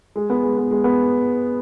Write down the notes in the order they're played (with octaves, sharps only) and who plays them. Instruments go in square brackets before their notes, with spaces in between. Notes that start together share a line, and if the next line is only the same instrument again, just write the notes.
[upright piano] G#3
B3
G#3
B3
G#3
B3